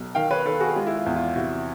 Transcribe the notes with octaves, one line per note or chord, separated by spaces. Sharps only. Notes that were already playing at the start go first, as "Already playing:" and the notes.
Already playing: B1
D#3 F5 G5
B4 C#5
D#3 A4 B4
F#4 G#4
G#3 F4 G4
E4
F4
E2
F4
C3 E4 F#4